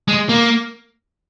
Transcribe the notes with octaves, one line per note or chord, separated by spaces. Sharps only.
G#3
A#3